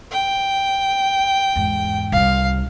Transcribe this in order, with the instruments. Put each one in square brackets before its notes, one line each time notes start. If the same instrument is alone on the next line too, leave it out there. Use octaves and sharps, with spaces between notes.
[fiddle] G5
[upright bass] E2 G#2
[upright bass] C2 C#3 [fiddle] F5